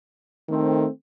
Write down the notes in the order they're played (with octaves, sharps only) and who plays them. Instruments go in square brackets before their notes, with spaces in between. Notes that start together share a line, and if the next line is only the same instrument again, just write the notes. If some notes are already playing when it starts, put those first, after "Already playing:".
[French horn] D#3 [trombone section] A3 C4